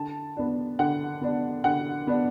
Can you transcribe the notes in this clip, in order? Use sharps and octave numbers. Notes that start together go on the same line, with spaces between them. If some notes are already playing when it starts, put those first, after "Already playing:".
Already playing: D3 A5
B3 D4
D3 F#5
B3 D4
D3 F#5
B3 D4